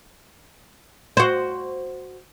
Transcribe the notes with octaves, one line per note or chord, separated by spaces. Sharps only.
F#4 C5